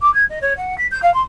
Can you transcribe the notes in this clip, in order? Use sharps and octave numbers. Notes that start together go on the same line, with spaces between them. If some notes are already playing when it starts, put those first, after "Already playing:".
D6
G#6
D#5
C#5
F#5
B6
G6
F5
C6